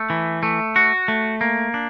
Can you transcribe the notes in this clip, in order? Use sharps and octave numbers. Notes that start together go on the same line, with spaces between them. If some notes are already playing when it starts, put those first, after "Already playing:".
Already playing: A3
E3
A3
F#4
A3
A#3
D4